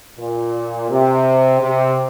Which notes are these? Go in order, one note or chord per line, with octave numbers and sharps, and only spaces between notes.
A#2
C3
C3